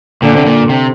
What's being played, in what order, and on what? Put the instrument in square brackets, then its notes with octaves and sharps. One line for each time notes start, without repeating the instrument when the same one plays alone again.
[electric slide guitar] A#2 [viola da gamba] D3
[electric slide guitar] C3
A#2
C3